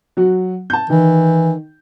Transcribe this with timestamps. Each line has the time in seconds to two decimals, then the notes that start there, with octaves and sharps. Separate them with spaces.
0.17 F#3 F#4
0.70 A5 G6
0.90 D#3 E3